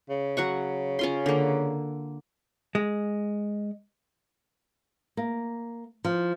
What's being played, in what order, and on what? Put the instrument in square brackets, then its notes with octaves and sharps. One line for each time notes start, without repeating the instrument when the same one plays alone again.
[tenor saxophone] C#3
[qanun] F#3 F#5 C#6
C#4 F4 C6
D3 A#3
[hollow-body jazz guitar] G#3
[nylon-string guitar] A#3
F3